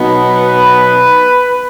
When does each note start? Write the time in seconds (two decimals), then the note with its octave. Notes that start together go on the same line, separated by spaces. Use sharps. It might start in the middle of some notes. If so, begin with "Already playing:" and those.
Already playing: B2 F#3 B3 D#4
0.37 B4